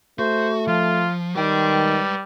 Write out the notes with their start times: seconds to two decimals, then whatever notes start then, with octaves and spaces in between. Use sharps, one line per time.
0.19 A3 F#4 C5
0.67 F3 F4
1.36 D#3 G3 B4 G5